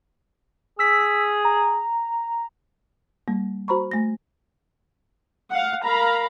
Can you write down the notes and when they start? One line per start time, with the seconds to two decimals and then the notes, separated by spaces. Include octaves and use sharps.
0.79 G#4 E6 B6
1.45 A#5
3.28 G3 A#3
3.68 F#4 C5 A#5 B5 C#6
3.91 A3 A#6
5.50 F5 F#5
5.83 A#4 F5 A#5 B5